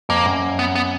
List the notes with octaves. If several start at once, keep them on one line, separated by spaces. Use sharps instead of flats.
F2 A#3
F#2
B3
B3